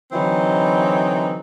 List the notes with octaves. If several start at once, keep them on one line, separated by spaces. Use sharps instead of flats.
D3 E3 F#3 C4 D#4 E4